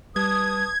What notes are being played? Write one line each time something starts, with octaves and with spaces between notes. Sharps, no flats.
G3 B4 A5 D#6 G#6